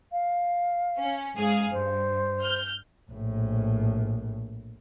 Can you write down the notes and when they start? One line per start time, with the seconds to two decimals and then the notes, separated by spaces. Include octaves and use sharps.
0.12 F5
0.98 C#4
1.36 G#2 G#4 F5
1.72 G2 C5
2.42 F6 G6
3.11 A#1 A2